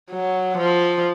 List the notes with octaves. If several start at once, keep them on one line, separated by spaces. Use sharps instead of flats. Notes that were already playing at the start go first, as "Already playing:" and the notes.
F#3
F3